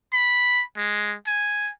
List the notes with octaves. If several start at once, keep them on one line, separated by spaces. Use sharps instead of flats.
B5
G#3
G#5